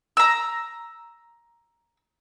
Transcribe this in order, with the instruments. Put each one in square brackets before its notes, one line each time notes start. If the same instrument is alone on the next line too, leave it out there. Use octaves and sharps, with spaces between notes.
[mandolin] A#5 E6